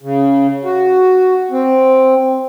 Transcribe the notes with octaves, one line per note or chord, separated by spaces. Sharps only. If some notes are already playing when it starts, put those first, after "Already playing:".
C#3
F#4
C4